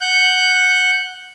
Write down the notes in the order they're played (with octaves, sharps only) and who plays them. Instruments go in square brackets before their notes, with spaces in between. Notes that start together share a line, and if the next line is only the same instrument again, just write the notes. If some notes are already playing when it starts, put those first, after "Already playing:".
[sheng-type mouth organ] F#5 F#6 G6